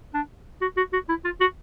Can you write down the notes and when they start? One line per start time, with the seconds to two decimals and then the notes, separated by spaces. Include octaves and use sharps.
0.14 D4
0.61 F#4
0.77 F#4
0.93 F#4
1.09 E4
1.25 F4
1.41 F#4